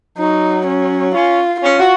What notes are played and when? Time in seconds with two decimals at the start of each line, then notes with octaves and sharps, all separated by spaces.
0.18 F#3 D#4
0.66 C#4
1.14 C#4 F4
1.63 C#4 F4
1.79 F#4